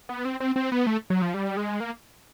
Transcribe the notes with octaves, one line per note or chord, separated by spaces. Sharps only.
B3
C4
C4
C4
B3
A3
F#3
F3
G3
G#3
A#3